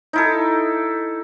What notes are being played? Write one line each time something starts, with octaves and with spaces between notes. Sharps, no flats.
D#4 E4 A4